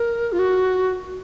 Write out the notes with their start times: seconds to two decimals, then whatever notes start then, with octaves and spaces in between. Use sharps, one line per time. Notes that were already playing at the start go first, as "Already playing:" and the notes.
Already playing: A#4
0.32 F4
0.39 F#4